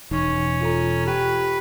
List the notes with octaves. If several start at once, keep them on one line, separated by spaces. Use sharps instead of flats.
E1 C#4 D#4 C#6
F4 A4 A#5
G4 B4 G5